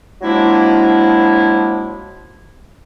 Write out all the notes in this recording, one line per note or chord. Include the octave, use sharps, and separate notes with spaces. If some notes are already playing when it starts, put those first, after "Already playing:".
F3 F#3 G#3 A#3 D4 E4